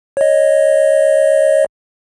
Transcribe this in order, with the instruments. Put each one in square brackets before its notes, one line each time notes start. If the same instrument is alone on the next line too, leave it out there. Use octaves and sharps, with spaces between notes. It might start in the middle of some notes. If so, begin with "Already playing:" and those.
[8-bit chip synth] C#5 D#5